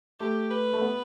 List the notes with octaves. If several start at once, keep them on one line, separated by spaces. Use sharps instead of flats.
A3 G4
B4
A3
B3